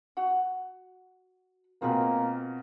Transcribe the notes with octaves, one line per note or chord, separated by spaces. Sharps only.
F#4 F#5
B2 A#3 C4 F4 G#4 B5